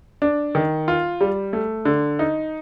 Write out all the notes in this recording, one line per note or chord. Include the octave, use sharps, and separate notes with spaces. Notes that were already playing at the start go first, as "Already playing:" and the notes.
D4
D#3
F4
G3
A3
D3
D#4